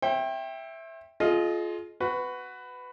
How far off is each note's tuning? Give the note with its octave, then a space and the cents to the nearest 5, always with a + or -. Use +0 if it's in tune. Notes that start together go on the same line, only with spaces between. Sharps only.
C5 +45 E5 +0 G5 +0
F4 +0 G#4 +40 D#5 +0
F#4 +0 B4 +15